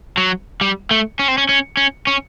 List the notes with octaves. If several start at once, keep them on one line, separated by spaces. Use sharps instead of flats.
F#3
G3
A3
C#4
C4
C#4
C#4
C#4
C#4